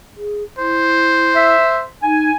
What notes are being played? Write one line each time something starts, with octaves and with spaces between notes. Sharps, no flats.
G#4
E4 C5
E5
D#4 G#5